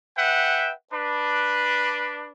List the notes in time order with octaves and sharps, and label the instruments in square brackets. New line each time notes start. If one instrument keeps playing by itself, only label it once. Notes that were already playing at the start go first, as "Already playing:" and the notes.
[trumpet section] B4 E5 F#5 G5
D4 B4